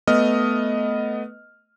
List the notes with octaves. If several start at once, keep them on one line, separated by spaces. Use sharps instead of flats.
A3 B3 D#5 D#6 F6